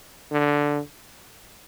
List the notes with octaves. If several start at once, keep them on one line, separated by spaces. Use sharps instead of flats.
D3